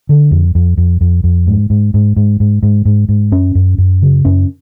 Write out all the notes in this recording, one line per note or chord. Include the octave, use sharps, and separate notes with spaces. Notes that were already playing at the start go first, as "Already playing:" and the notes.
D3
F2
F2
F2
F2
F2
G#2
G#2
G#2
G#2
G#2
G#2
G#2
G#2
F#2 C#4
F#2
F#2
C#3
F#2 C#4